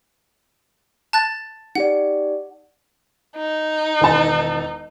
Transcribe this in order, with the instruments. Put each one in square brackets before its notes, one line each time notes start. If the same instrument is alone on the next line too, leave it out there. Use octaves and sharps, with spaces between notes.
[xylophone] A5 F#6 A6
[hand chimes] D#4 G4 D5 [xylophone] F#5
[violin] D#4
[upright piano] E1 D#3 A5